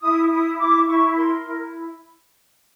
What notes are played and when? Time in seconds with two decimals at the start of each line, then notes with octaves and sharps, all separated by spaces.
0.01 E4 D#6
0.30 E4 D#6
0.59 E4 D6
0.87 E4 C#6
1.16 A#4 C6
1.44 E4